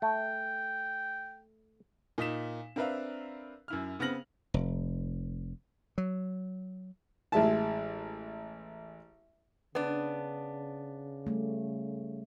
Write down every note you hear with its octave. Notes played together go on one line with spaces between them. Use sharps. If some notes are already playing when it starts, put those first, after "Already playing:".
A3 G5
A#2 D#4 D#6 B6 E7
C4 D4 A#4 B4 E5 F5
F#2 E4 F6
C#3 B3 C4 F6 A#6 F#7
F1
F#3
A1 G#3 E5 A5
C#3 B3 D4
G3 A3